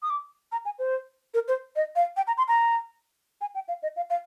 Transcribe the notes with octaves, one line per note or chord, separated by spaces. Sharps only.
D#6
D6
A#5
G#5
C5
A#4
C5
D#5
F5
G5
A#5
C6
A#5
G#5
G5
F5
D#5
F5
F5